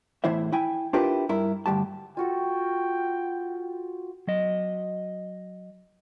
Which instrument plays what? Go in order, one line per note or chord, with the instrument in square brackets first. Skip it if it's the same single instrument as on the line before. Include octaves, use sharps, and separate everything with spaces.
[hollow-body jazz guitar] E2 A2 E3 E4 C5 E5
E4 G5 G#5
D4 E4 F4 G4 A#4 B4
G2 E4 A#4
D2 G2 G4 A5
[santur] F4 F#4 A4 [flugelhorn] G5
[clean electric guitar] F#3 D#5